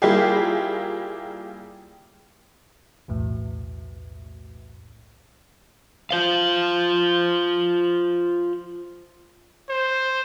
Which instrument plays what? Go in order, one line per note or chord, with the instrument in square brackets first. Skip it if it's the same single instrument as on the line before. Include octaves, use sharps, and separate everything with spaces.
[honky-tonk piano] G3 A#3 E4 F4 G4 G#4
[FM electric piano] B1 E2 A2
[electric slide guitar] F4 C5 F5
[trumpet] C5